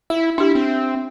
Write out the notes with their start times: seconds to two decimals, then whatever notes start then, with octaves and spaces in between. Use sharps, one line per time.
0.10 E4 E5
0.38 D4 E4 G4
0.55 C4